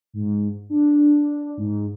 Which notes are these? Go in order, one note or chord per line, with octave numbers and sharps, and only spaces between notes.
G#2
D4
G#2